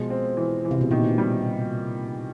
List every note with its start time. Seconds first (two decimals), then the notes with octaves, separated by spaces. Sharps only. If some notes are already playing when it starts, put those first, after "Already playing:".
Already playing: B2 F3 G#3
0.10 C4
0.37 E3
0.65 E3
0.71 C3
0.81 B2
0.91 A#2 D#3
1.18 G3